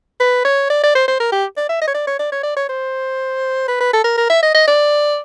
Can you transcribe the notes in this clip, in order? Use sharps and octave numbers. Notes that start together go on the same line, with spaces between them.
B4
C#5
D5
D5
C5
C5
A#4
G4
D5
E5
D#5
C#5
D5
C#5
D5
C#5
D5
C#5
C5
B4
B4
A4
A#4
A#4
E5
D#5
D#5
D5